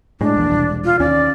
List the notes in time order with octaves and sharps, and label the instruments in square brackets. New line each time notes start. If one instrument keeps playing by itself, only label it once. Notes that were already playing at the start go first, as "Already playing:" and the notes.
[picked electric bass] A2 G#3 [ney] D4
[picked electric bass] A#1 E2 A#2
E1 C2
[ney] F4
[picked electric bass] D#2 C#4 [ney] D5